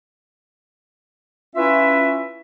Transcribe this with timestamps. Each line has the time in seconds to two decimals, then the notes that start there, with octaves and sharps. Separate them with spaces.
1.55 C#4 E4 F4 B4 E5